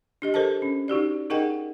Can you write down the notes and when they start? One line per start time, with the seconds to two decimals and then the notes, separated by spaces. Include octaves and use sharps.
0.22 D4 G4 D#5
0.34 G4 A4 A#4 C5 D#5 A5
0.62 C#4
0.88 D#4 F#4 G4 D5
1.30 D#4 G#4 A#4 D#5 F#5 G5